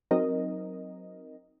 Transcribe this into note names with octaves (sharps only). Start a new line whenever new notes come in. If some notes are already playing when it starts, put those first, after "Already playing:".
F#3 C4 D#4 A#4 D#5